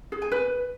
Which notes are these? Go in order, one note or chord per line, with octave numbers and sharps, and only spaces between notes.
G#4
G#5
B4